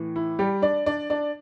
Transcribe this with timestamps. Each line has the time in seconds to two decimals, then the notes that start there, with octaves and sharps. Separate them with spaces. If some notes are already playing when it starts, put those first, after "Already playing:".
Already playing: A2 E3
0.16 E4
0.39 G3 G4
0.62 D4 D5
0.86 D4 D5
1.10 D4 D5